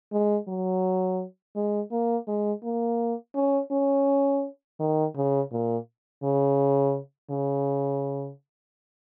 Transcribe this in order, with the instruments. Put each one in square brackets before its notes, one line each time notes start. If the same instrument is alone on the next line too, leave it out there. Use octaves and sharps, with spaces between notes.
[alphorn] G#3
F#3
G#3
A#3
G#3
A#3
C#4
C#4
D#3
C#3
A#2
C#3
C#3